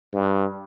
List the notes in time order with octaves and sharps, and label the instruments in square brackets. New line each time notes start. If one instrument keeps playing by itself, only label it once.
[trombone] G2